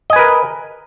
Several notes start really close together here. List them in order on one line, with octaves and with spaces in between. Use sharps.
D#5 G#5 B4 A#4